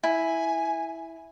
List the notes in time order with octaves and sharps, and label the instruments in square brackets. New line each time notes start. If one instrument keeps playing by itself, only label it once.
[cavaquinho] E4 [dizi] G#5